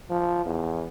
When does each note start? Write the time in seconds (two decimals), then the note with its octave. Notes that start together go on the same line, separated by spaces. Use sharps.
0.10 F3
0.45 E2